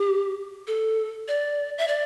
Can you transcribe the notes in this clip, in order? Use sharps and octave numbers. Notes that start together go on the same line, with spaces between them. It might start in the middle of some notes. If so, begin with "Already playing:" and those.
Already playing: G4
A4
D5
E5
D5